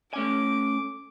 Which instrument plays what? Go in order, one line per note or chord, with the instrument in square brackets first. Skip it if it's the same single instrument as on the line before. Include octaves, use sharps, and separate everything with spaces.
[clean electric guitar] A3 C#4 G#5 [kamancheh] D6